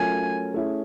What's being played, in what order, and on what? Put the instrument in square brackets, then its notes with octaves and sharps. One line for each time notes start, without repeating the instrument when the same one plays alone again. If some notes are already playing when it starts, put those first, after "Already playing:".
Already playing: [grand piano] F#3 A3 C#4 F4 A#4 [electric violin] G#5
[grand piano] A3 C#4 E4 G#4